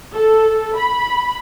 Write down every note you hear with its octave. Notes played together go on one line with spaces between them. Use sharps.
A4
B5